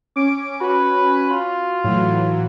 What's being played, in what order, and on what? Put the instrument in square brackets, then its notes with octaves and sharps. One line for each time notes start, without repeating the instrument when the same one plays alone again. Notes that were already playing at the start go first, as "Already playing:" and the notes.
[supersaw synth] C#4 [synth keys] D6 D7
[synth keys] F#4 [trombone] B4
[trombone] F4
[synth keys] A2 [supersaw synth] E3 F#3